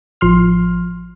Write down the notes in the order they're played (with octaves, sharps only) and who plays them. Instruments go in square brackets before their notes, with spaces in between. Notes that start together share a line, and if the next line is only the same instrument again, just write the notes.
[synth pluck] A1 F3 C6 F6